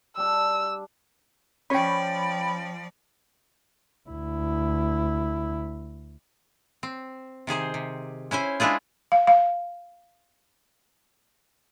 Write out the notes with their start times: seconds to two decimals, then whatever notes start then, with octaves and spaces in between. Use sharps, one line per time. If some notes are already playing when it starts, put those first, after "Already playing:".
0.17 G3 D4 E6
1.70 F3 C#4 C#5 D5 G5 B5
4.09 D2 E4
6.83 C4
7.47 C3 D#3 G#4 C5
7.74 C3
8.31 C#4 E4 C5 G#5
8.60 G#3 D4 E4 F4 G#4
9.12 F5
9.27 F5